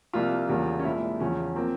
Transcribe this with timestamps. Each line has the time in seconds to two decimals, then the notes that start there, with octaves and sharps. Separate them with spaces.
0.13 C2 C3 F3 A#3 F4
0.49 E2 C#3 G3 A#3
0.79 C#4
0.84 C2 A#2 G#3 E4
1.20 E2 C#3 F3 C#4
1.56 F3 A#3 C4